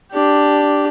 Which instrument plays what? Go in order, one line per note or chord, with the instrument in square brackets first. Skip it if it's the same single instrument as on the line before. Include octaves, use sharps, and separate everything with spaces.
[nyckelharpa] D4 G4